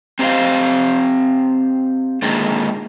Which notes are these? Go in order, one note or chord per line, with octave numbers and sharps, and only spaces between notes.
C4 G4 C5 D#5 F5
A#2 D3 D#3 G#3